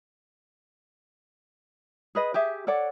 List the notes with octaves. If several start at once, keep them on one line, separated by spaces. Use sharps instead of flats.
G#4 B4 D#5
G4 G#4 E5
A4 C#5 D5 F#5